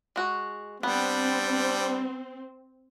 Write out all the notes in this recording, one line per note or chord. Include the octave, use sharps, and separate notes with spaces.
G#3 F#4
G3 B3 C4 D4